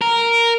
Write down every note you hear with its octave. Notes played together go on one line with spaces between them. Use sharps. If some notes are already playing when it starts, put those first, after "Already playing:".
A#4